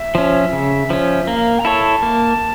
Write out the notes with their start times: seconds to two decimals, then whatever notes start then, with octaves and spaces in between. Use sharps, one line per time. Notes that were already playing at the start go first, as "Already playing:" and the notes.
Already playing: E5
0.15 F3 C#4
0.53 C#3
0.90 F3 C#4
1.27 A#3 F5
1.59 A#5
1.64 E4 A4 C#5 A5
2.03 A#3